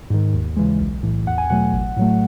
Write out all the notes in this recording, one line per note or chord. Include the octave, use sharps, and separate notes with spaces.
G#2 D#3
D#2
C#3 E3 G#3
B1
A2 E3
E2 F#5
G#5
B2 F#3 A3 F#5
A1
A2 F#3 A3